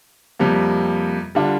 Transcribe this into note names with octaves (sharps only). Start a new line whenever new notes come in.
F2 C3 G3 A#3
D3 G3 D4 F4